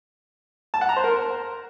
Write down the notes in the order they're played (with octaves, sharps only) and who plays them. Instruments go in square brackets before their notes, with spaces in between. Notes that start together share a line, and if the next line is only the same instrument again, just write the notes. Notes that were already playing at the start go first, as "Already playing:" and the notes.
[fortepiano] A5
F#5
A#5
C5
A#4